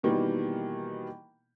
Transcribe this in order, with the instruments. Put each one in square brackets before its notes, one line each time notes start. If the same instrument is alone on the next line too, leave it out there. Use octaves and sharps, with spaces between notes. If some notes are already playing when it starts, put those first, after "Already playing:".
[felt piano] B2 D#3 E3 G3 A#3